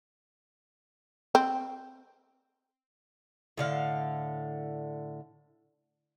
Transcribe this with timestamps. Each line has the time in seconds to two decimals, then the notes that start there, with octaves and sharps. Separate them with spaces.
1.35 C4
3.58 A2 D3 F5